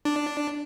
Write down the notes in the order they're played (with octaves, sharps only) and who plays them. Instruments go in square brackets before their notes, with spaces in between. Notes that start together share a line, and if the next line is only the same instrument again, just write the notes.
[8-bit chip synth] D4